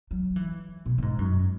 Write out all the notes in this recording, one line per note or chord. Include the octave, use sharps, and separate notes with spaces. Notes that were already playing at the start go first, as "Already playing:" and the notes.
F#3
E3
B2
B2
G#2
F#2